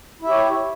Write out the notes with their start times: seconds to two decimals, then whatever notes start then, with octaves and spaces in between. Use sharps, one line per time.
0.21 E4
0.24 E5
0.28 G4
0.31 C#5